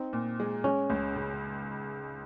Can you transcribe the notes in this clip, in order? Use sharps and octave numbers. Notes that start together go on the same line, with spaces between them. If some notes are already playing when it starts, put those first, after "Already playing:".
Already playing: C4 D#4
A#2
G#3
G#3 C#4
C#2
C#3